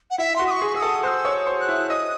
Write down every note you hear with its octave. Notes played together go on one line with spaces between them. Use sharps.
F#5
E4 E5
F#4 C6
D#6
C#6
G#4
G#4 E6
A4 D#6
C5 F#6
E6
C#5
C5
F#6
E4
D#5 E6
D#6